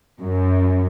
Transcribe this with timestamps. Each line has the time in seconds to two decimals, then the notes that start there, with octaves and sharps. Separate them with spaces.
0.21 F#2